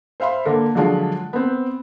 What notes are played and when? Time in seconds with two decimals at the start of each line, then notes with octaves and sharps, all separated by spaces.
0.20 C5 E5 F5 B5 C6
0.45 D3 A#3 A4
0.75 D3 F3 F#3 G#3 D4 F4
1.33 B3 C4